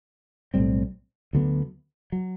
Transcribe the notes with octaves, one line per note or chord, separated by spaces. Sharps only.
B1 A2 G3 C4
D2 D3 F#3 B3
F#3